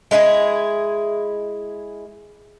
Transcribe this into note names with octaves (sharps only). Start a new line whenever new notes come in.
G#3 E4 F4 G#4